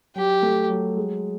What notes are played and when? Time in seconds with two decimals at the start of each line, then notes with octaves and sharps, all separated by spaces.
0.16 F#3 G4
0.43 A3
0.70 F#3
0.97 G#3